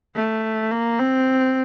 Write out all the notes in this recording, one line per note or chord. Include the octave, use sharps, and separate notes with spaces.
A3
A#3
C4